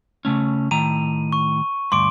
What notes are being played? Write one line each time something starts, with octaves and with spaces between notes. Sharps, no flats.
C#3 A3 C#4
A2 D#3 A#5 D#7
C#6
D2 G2 C6 D6 D7